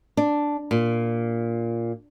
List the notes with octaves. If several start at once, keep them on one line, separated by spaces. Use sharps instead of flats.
D4
A#2